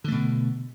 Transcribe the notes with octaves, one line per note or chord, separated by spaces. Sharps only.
B2 D3 A3